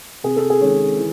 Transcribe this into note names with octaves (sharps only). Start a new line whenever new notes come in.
C3 G#4
A4
G#4
D#3 G#3 C#4
E3